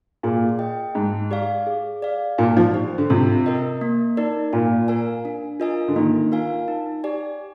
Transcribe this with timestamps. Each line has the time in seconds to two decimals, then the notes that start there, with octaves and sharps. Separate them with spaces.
0.23 A#2 G#4
0.59 D#5 G5
0.95 G#2 D#4
1.31 G4 D5 F5
1.67 G#4
2.02 D5 F5
2.38 A#2 D#4
2.57 F3
2.74 G4 C5
2.98 D3
3.10 C3 F4
3.46 A#4 D#5
3.81 A#3
4.17 D#4 A#4 D5
4.53 A#2 F4
4.88 A#4 F5 G#5
5.25 D4
5.60 F4 A#4 D#5 G#5
5.88 D3
5.96 D#3 A#3
6.32 F4 A#4 F5 G#5
6.68 D#4
7.04 G4 D5 G#5